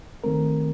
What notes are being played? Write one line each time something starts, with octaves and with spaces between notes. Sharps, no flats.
D#2 D#3 A3 C4 A#4